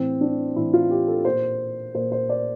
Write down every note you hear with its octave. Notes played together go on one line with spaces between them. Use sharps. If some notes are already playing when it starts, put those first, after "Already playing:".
Already playing: A2 E3 C4
D4
A2 E3 E4
F4
G4
A4
A#2 C5
A#2 C5
C5
D5